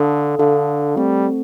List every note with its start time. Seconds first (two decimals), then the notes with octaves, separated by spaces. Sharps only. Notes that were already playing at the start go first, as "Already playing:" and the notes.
Already playing: D3 D4 A4 F5
0.39 D3 D4 A4 F5
0.96 G3 A3 C4 A4